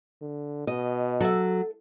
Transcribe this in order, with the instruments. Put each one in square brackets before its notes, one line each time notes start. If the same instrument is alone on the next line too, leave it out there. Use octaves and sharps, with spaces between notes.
[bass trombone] D3
[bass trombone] B2 [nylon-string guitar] D#5
[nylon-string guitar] F#3 [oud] A4 E5